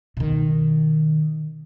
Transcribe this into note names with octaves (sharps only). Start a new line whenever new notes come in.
B2 D#3